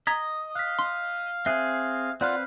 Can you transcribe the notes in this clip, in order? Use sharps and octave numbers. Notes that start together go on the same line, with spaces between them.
D#5 A#5 G#6 B6
F5 F#6 B6
C6
C4 G#4 E5 F#6 C7
C4 F4 B4 D5 F5 F#5